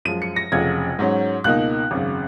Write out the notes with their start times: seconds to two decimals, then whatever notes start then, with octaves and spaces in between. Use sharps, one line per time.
0.05 F#2 F3 G#3 D#7
0.22 C#7
0.36 A#6
0.52 F1 F2 C#3 F#3 G#6
0.99 G#2 F#3 C#4
1.44 C#2 B2 A#3 D#4 F#6
1.91 G#1 F#2 C#3